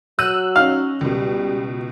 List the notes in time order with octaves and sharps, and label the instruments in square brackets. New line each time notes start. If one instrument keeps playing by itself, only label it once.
[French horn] F#3 [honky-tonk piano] E6 F#6 D#7
[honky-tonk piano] C#4 D#4 [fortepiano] F5
[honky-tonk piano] C#2 B2 [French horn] G3